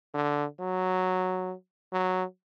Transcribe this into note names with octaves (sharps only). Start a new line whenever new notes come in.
D3
F#3
F#3